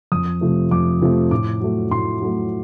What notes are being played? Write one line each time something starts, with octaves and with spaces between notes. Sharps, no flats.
F2 D#6
C3 F3 A3
F2 D6
C3 F3 A3
A2 D6
F#3 A3
A2 C6
F#3 A3